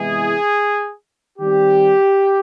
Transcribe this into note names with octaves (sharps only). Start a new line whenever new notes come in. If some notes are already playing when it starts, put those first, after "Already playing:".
Already playing: C3 E3 G#3 B3 E4 G#4
D#3 G3 C4 G4